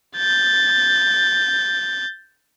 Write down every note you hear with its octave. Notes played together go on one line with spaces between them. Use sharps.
G6 A6